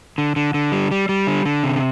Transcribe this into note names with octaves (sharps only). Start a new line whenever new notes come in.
D3
D3
D3
G3
G3
G3
D3
D3
C3